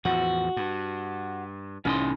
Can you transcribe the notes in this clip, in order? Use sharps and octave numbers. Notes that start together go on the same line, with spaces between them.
E2 A2 F3 F#4
G2
C2 A2 E3 C#4 D#4 C6